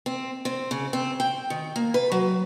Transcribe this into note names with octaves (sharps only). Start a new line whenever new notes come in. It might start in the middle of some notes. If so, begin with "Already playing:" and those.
C4
C4
C#3
C4
G5
D#3
A#3
B4
F#3